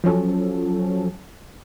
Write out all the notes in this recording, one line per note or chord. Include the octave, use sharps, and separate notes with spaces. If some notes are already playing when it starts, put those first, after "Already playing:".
F3 F#3 C#4 A4